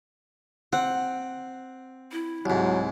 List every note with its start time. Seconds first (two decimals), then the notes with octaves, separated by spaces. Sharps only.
0.73 C4 F#5
2.12 E4
2.46 C2 G#2 F#3